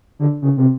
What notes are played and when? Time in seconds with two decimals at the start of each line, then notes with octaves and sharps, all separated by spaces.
0.19 D3
0.42 C#3
0.57 C3